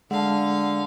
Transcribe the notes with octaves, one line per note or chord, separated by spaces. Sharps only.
D3 G#3 F5 F#5 A5